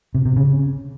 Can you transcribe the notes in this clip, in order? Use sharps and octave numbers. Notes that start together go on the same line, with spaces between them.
C3
C3
C#3